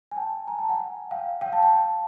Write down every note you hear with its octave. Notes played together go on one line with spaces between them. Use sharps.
G#5
G5 A5
G#5 A#5
G5 A5
F#5 G#5
F5 G5
F5 G5
G5 A5
G5 A5